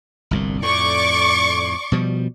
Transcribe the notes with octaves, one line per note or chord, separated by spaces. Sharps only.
G1 C2 A#2
F2 A2 D5 C#6 D6
B2 F3 G3